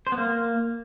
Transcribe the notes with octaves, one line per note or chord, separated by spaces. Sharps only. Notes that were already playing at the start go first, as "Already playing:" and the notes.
C5
B3
A#3